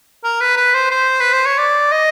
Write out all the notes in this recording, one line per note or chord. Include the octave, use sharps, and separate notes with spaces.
A#4
B4
B4
C5
C5
B4
C5
C#5
D5
D#5